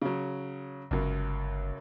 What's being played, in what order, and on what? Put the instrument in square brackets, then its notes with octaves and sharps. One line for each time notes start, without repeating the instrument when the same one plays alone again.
[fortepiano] C#3 F#3
[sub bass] G1 [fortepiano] C#2 F#2